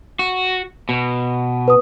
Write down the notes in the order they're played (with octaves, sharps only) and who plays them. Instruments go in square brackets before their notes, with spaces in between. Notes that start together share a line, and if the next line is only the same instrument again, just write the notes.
[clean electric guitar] F#4
B2
[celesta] B4 D#6